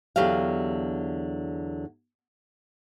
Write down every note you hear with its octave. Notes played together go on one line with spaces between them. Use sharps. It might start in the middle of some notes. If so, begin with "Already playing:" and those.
E2 D3 F#3 G4 F5